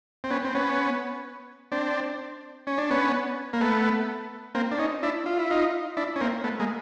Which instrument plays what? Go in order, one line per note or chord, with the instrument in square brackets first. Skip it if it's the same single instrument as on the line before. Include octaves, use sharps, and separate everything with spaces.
[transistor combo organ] C4
B3 C#4
C4
B3 C#4
C4 D4
C#4
D4
B3 C#4
A#3
A3 B3
A#3 C4
D4
C#4 D#4
D4 E4
F4
E4
D#4 F4
D4 E4
C#4
A#3 C4
A3 B3
G#3 A#3